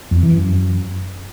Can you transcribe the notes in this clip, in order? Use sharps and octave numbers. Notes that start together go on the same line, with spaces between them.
F2
E3
F#2